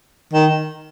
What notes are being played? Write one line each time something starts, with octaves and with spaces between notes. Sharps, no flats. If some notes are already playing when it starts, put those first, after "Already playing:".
D#3